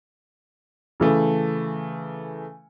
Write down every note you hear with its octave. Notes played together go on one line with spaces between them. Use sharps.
C#3 E3 A3